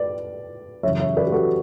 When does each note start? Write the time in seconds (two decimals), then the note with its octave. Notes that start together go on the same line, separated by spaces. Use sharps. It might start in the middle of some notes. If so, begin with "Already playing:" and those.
Already playing: B4 D5
0.83 F#2 C#3 E3 C#5 E5
1.00 C#5 E5
1.17 B4 D5
1.27 G4
1.32 F#4 A4